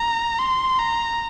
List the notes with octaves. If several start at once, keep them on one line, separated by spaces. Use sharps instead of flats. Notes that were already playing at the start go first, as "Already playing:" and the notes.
Already playing: A#5
C6
A#5